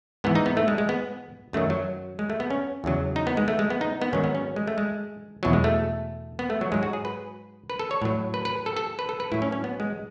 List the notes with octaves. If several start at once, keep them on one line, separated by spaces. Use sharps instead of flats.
G#2 E3 B3
D#4
B3
A3
G#3
G#3
B3
F#2 D#3 F#3 A3
F#3
G#3
A3
B3
C#4
E2 C#3 F#3
D#4
B3
G#3
A3
G#3
B3
D#4
B3
G#2 D#3 F#3 C#4
B3
C#4
G#3
A3
G#3
E2 B2 F#3
G#3
A3
B3
A3
F#3
G#2 F#3 G#3
F#4
G#4
B4
B4
A4
C#5
A2 F#3
B4
B4
A4
A4
B4
A4
B4
A2 F#3 E4
C#4
C#4
B3
G#3